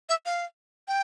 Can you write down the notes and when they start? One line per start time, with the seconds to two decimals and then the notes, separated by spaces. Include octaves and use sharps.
0.09 E5
0.26 F5
0.88 G5